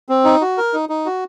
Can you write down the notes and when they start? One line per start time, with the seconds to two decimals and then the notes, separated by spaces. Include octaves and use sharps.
0.09 C4
0.25 D#4
0.41 F#4
0.57 A#4
0.73 D#4
0.89 D#4
1.06 F#4